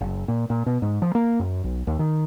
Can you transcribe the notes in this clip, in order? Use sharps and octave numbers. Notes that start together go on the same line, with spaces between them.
F#1
A#2
A#2
B2
G#2
F3
A#3
F#2
B1
D#2
D#3